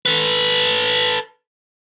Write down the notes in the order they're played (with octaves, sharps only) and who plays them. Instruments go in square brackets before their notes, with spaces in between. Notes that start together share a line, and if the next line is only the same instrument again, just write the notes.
[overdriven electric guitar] A4 B4